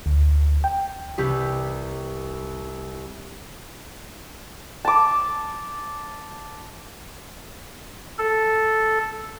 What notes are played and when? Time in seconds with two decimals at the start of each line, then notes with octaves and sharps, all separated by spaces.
0.06 D2
0.64 G5
1.18 C2 G4 B4
4.85 A5 D6
8.19 A4